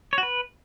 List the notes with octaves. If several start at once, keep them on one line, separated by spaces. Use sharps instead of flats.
C#5
F#4
B4